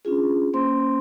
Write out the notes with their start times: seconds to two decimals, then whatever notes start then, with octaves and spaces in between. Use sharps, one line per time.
0.05 C#4 D4 F4 G#4
0.53 A#3 C#4 C5 C6